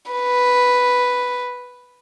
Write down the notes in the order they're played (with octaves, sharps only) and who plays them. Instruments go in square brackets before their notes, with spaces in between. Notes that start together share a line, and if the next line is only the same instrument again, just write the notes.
[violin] B4